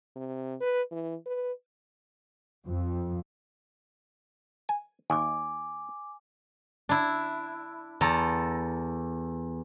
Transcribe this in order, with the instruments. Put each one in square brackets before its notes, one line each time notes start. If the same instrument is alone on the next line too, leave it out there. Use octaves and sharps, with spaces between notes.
[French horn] C3
B4
E3
B4
[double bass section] F2
[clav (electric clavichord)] G#5
[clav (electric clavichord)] D#2 [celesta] G#5 D6
[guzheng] D4 E4
E2 A4 A#5